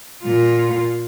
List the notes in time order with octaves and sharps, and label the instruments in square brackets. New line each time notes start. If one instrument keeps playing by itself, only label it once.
[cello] A#2 F4